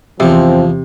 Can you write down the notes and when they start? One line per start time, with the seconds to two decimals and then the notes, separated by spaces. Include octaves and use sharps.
0.20 E2 C3 E3 F3 C4